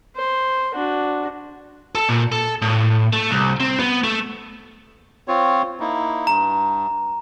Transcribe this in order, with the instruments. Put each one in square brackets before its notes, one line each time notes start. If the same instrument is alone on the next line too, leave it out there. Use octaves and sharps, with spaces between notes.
[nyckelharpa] C5
D4 F#4
[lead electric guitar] A4
A#2
A4
A2
A3
C2
C4
B3
A3
[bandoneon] C4 F4 C#5
A#3 D#4 E4
[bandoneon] G2 [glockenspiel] A#5